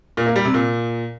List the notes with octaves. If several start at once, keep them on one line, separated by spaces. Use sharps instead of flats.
A#2
A#3
G3
C3
A#2